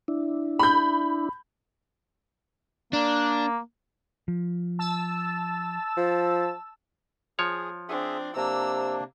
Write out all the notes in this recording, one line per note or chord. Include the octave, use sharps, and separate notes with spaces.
D4 E4
B5 G6
A#3 D4
F3
A5 E6
F3
F3 G#4 C#5
C4 D4 G#4 E5
C3 A#3 D4 A#5 E6